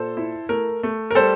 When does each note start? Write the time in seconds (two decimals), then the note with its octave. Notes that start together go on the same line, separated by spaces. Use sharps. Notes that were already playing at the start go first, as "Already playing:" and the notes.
Already playing: A#2 A4 C5
0.17 E4
0.49 A3 A#4
0.83 A3
1.11 A#4
1.15 G3 A4 C5